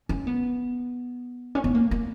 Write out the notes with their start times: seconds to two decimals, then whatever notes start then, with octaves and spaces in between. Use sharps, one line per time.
0.09 C#4
0.27 B3
1.55 C#4
1.64 B3
1.75 A#3
1.91 A#3